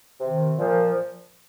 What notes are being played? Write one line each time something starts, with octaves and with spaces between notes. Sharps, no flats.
C3 D#3
A#2 F3